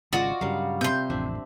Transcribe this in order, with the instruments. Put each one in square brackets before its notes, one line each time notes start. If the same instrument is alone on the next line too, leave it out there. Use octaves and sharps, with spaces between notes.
[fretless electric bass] G#1 C#3 G#3 [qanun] F4 D#5 [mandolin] F#4 D5
[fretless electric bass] G2 C#3 F#3 [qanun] G3 A#4 F5
[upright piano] C3 [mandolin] C6 G6
[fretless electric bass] A1 F2 [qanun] C4 D4 E5